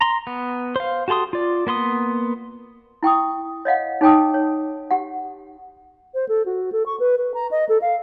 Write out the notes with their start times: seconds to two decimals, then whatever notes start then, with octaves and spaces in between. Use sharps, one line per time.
0.01 A#5 C6
0.27 B3
0.76 C5 F5
1.08 F#4 G4 A4 C6 D#6
1.33 F4 D5
1.67 A#3 B3 C6 D#6
3.03 E4 G5 C#6 D#6
3.65 C#5 D#5 F5 F#5
4.01 D#4 G#4 C#5 G5 A5 D#6
4.34 C#5
4.91 G4 F#5
6.14 C5
6.29 A4
6.46 F#4
6.72 A4
6.86 C#6
7.00 B4
7.18 B4
7.34 A#5
7.51 D#5
7.69 A4
7.82 F5